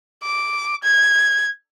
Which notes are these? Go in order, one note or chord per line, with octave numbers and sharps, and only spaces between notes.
D6
G#6